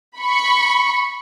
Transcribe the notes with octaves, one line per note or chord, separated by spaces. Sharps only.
B5 C#6